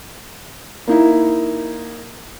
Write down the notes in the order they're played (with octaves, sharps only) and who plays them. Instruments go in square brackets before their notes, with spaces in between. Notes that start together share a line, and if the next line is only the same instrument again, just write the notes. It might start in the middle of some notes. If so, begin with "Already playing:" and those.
[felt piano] A#3 D#4 E4